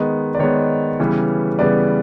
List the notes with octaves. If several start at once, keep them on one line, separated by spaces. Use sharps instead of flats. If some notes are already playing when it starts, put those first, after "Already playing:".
Already playing: D#3 G#3 B3
D5
D#3 G#3 B3 C#5
C#3 E3 G3 B3
C#3 E3 G3 B3 D5